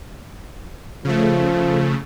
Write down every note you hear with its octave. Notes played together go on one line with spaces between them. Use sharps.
C#3 F3 A3